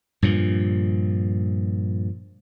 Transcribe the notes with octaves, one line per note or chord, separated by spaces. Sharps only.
G2 A#2 F3